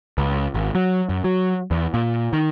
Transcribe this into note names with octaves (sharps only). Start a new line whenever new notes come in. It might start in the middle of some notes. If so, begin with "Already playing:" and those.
C#2
G#1
F#3
F#2
F#3
E2
A#2
D#3